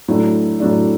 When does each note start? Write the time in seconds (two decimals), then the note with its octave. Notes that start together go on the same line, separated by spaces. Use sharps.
0.08 A2 F#3 A3 D4
0.60 A2 F#3 A3 D4